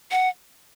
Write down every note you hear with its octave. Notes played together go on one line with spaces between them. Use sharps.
F#5